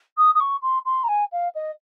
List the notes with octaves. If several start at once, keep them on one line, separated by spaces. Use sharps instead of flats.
D#6
D#6
C#6
C6
C6
A#5
G#5
F5
D#5